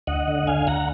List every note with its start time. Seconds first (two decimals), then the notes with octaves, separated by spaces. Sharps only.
0.07 D2 D#5 F#5
0.28 D3
0.47 D2 F5 G#5
0.67 D2 F#5 A#5